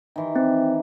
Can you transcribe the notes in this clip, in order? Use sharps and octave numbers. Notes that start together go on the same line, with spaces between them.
D#3 E3 C6
C4